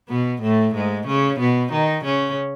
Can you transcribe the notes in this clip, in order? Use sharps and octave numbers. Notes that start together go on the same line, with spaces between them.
B2 B3
A2 A3
G#2 G#3
C#3 C#4
B2 B3
D#3 D#4
C#3 C#4